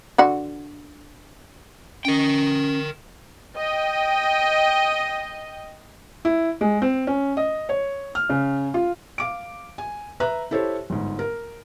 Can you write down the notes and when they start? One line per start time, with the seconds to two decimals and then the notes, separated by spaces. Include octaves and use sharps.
0.18 D3 F#4 F#5
2.05 C#4 A#4 G5
3.56 D#5 G5
6.25 E4
6.61 G#3
6.82 C4
7.07 C#4
7.37 D#5
7.69 C#5
8.15 F6
8.29 C#3
8.74 F4
9.18 F5 D6 D7
9.78 G#5
10.20 B4 E5 A#5 F#6
10.51 E4 G4 A4 C5 C#5
10.90 G1 G#2
11.19 A#4